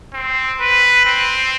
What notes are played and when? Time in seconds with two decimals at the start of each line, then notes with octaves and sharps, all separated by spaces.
0.14 C4
0.61 B4
1.06 C4